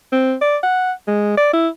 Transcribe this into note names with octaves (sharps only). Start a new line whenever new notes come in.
C4
D5
F#5
G#3
D5
E4